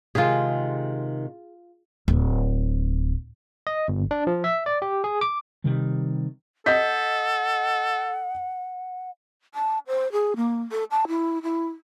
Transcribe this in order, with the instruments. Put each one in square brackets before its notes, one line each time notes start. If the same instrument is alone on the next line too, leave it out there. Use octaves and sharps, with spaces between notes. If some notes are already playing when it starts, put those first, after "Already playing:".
[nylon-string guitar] C3 D#3 G#3 [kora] F4 G#4
[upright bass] D1
[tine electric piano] D#5
G1
D4
F3
E5
D5
G4
G#4
D6
[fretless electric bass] C3 D#3 G3
[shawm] A4 [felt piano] D#5 G6 B6 [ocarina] F#5
[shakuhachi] A5
C5
G#4
A#3
A4
A5
E4
E4